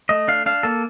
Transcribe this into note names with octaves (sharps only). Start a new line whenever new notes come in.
A3 D#5
D4 F5
D4 F5
A#3 A4